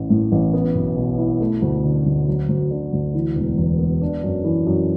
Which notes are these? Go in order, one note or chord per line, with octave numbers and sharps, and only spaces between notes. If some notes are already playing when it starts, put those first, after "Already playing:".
Already playing: A1 E3
A2
A1
B3
B1
B2
E4
A3
D2
D3
D2
F#3
D2
D3
D2
E3
E1
E2
B3
D4
F#2
E3
F#2